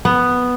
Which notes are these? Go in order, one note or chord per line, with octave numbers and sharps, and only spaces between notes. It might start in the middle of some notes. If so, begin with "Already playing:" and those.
B3